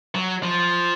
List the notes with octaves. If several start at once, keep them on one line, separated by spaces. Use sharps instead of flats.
F#3
F3